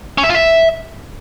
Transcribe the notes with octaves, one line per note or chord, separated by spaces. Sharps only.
C#4
E5
F4
E5